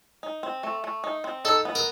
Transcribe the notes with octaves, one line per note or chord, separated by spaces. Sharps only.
D#4
C4
A3
A3
D#4
C4
D#4 A4
B3
A#4